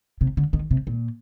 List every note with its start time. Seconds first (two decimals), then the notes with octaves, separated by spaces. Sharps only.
0.21 C3
0.37 D3
0.53 D#3
0.71 C3
0.87 A#2